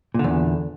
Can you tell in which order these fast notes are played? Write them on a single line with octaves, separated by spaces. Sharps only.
A#2 D3 E2